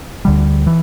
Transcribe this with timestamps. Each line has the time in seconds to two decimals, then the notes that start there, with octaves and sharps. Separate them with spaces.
0.25 D2 D3 G3
0.67 E3